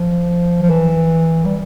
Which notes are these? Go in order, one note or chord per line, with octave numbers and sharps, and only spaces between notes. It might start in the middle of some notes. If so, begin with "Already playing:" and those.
Already playing: F3
F3
E3
G3